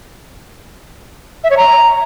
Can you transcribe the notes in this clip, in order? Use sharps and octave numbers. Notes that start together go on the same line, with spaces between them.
E5
C#5
A#5